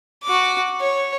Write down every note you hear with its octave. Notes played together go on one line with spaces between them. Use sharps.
F#4 D6
C#5